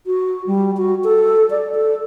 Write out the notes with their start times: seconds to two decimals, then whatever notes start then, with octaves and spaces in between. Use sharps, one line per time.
0.06 F#4
0.47 G3
0.77 F#4
1.04 A4
1.51 D5
1.74 A4